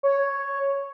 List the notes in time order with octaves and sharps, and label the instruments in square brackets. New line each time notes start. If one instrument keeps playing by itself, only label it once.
[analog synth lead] C#5